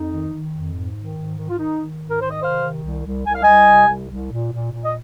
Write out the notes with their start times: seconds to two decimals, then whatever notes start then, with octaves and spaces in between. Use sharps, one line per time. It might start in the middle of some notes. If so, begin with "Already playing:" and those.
Already playing: F2 D#4
0.11 D#3
0.32 D#3
0.53 F2
0.73 G#2
0.95 D#3
1.16 G#2
1.37 D#3
1.49 F4
1.58 D#3 D#4
1.78 D#3
2.00 G#2
2.10 A#4
2.20 D#3 C5
2.30 D#5
2.42 C3 C5 F5
2.62 D#3
2.83 C2
3.05 C2
3.25 C2 G#5
3.34 F5
3.43 C2 D#5 G#5
3.68 C3
3.88 C2
4.10 C2
4.31 A#2
4.51 A#2
4.72 A#2
4.85 D#5